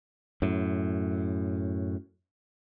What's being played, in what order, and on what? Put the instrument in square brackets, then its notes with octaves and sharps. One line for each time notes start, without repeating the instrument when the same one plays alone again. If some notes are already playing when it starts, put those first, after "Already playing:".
[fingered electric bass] F#2 A2